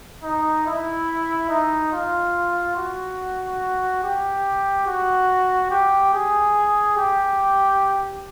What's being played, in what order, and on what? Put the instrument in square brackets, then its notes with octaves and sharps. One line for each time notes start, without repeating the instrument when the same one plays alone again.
[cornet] D#4
E4
D#4
F4
F#4
G4
F#4
G4
G#4
G4